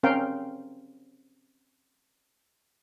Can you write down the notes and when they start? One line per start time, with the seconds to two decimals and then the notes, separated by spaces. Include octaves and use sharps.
0.03 C4 C#4 A#4 F5 G5